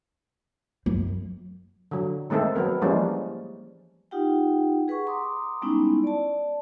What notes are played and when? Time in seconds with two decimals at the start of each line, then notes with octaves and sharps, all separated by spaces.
0.86 F#2
1.91 D3 F#3
2.30 D#3 G#3 A3 C4 A4
2.55 F#3 B3 A#4
2.82 E3 F3 G3 G#3 A#3 C#4
4.11 D#4 F4 G4 F#5 G5
4.88 G#4 B4 F#5 C#6
5.07 A#5 C6 D6 D#6
5.62 G3 G#3 B3 C#4 D#4 E4
6.04 D5 A5